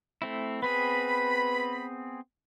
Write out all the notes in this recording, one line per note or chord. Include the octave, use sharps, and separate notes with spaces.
A3 C4 E4
B3 C4 G#4 B4 B5